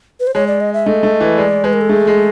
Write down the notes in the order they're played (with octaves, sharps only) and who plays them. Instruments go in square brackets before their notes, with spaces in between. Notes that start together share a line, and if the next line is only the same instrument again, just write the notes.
[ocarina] B4
C5
[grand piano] G#3 [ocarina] C#5
[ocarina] D5
D#5
E5
[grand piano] A3 [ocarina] D#5
[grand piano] A3
E3
[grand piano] G#3 [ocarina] D5
[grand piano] G#3 [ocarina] B4
[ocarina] A#4
A4
[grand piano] A3 [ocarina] G#4
[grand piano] G#3